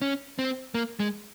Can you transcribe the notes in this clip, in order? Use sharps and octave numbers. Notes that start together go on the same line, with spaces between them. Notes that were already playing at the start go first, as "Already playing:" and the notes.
C#4
C4
A#3
G#3